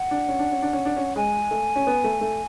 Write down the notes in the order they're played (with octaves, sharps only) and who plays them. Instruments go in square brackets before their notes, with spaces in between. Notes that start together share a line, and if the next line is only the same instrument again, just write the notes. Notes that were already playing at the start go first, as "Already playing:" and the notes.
Already playing: [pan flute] F#5
[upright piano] D4
C#4
D4
C#4
D4
C#4
D4
C#4
[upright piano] G#3 [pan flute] G#5
[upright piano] A3
C#4
B3
A3
A3